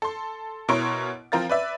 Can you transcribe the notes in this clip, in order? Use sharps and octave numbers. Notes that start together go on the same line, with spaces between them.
A4 C6
B2 E4 A#4 C#5 C6 D7
F3 C4 A#4 F5 A6
B4 D5 E5